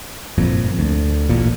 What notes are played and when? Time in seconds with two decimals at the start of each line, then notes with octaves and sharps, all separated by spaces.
0.38 G1 F2 A#2
0.79 D2
1.29 A1 A#2